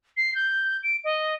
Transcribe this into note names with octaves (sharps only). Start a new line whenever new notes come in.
C7
G6
D7
D#5